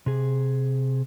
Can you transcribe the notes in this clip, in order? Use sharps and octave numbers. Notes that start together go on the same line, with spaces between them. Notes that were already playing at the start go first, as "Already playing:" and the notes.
C3 G#4